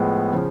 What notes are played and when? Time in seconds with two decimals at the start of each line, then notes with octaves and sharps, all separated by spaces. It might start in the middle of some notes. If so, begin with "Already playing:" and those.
Already playing: A2 F3 G#3 B3
0.32 C#3 F3